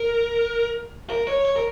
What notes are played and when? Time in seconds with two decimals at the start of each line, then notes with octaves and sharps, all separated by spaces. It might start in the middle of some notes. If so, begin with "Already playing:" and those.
Already playing: A#4
1.10 A#4
1.27 C#5
1.45 C#5
1.56 A#4